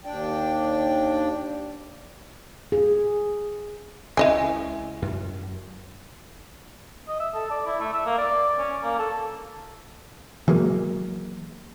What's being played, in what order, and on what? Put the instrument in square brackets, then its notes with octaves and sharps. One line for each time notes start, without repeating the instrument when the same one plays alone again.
[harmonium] D#2 D4 D5 G5
[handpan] G#4
[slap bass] C#2 C#4 [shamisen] E4 D#5 G#5
[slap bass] F#2
[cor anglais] D#5
E5
A4
D5
E4
A3
E5
A#3
D5
C#4
A#3
A4
[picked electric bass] E3 F#3 G#3 A#3